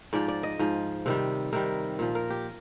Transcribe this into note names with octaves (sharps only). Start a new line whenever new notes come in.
G#2 F3 D5
D5
D#5
G#2 F3
C3 D#3 G3
C3 D#3 G3 A#4
A#2 F3
A#4
G4